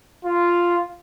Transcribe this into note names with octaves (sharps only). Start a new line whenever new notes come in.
F4